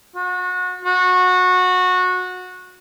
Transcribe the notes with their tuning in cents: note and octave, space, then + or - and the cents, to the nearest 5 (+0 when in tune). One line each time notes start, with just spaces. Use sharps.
F#4 -30
F#4 -20